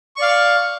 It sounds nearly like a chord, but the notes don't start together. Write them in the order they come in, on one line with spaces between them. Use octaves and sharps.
C#6 D5 F5